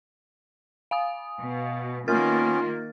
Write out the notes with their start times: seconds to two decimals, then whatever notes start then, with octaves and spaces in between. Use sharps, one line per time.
0.91 F5 G#5 D#6
1.40 B2
2.08 D#3 A#3 B3 C#4 F4 A#4 F6 A6